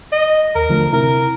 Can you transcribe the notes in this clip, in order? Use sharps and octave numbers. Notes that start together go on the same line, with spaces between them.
D#5
D#2 A#4
D3 F3 A3
C3 E4 A#4